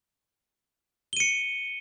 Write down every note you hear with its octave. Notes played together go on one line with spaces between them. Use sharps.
C#7 D#7 G7